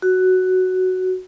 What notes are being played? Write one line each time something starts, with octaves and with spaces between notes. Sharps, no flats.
F#4